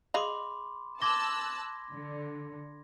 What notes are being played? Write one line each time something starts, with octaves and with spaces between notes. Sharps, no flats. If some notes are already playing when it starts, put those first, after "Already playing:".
G#4 D#5 F5 B5 C6 D6
A5 C6 D6 E6 F#6 G#6 A#6 G7
D3